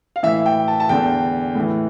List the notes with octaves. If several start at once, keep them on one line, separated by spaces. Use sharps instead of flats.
F5
A2 E3 E5
G5
A5
A5
E2 D3 G5
A2 E3